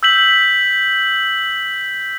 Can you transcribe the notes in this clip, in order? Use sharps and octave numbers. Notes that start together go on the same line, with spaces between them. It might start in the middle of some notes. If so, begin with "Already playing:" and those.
E6 G6 B6 F#7